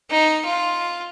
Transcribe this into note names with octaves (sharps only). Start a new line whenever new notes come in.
D#4
F4